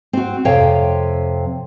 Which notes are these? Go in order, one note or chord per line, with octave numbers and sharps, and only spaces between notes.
C4 F#4
F2 C3 C#5 F5 G5